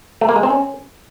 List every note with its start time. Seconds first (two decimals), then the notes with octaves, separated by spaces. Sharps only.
0.21 A3
0.29 A#3
0.36 G#3
0.43 C4
0.50 C#4